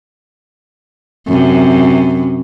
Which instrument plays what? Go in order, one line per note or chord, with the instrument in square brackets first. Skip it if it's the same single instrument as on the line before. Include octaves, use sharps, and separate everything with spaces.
[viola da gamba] F#2 C3